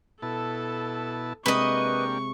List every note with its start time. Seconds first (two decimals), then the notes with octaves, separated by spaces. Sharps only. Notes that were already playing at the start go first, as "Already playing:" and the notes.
0.22 B2 E4 A4 A5
1.46 C3 G#3 A#3 D4 G4 B4 D#5 C#6